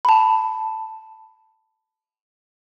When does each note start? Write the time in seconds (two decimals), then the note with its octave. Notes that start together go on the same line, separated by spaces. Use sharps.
0.05 A5 B5